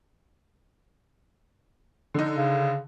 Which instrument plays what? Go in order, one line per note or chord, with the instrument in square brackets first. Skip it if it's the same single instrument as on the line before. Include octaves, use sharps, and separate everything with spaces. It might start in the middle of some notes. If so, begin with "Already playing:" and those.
[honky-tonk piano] D3 D#4
[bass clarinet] C#3